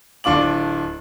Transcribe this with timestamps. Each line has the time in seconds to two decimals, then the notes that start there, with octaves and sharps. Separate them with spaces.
0.24 D1 D4 F4 D6 F#7